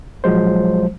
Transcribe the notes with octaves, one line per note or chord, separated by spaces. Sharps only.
A#1 F3 F#3 G#3 C5